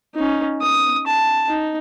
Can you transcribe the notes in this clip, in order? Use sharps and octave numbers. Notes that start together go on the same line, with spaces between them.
C#4 D#4
D#6
A5
D#4